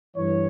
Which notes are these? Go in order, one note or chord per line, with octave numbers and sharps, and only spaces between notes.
G2 E3 C#5